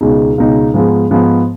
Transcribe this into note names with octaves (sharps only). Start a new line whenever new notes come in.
C#2 B2 G#3 D#4
C#2 B2 G#3 D#4
G#2 F3 G#3 B3
G#2 F3 G#3 B3